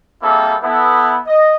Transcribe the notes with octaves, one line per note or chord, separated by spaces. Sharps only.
G3 A#3 C4 E4 G#4 A4
B3 E4 A4
D#5